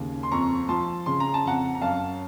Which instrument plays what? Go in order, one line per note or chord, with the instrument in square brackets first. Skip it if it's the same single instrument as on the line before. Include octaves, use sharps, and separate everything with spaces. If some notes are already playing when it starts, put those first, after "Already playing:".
Already playing: [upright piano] D#2 C#3
C6
F2 A#5 C#6
F3 A5 C6
C#3 C6
A#5
A5
F2 F#5 A#5
A#5
F#2 F5 A5